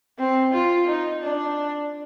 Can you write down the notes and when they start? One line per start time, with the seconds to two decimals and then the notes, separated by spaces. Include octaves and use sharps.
0.19 C4
0.54 F4
0.88 D#4
1.22 D4